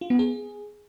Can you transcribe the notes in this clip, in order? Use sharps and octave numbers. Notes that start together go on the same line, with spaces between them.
F4
B3
G#4